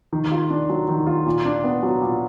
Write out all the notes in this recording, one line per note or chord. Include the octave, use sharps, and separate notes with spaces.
D#3
F4
D4
F#3
D#3
F4
A#2
D4
B3
F#3
A#2